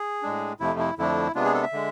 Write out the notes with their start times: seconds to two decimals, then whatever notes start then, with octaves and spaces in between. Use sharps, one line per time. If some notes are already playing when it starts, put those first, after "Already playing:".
Already playing: G#4
0.23 A2 G#3 D4
0.60 F2 C3 F3 A3 E4
0.79 E4
0.98 F2 D3 F3 A3 D4 E4
1.35 C3 G#3 B3 D4 F4
1.44 G#4
1.54 A4
1.63 E5
1.73 D3 G#3